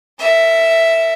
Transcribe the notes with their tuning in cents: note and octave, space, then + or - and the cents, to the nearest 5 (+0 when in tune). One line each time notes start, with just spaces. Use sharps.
A#4 -40 E5 +0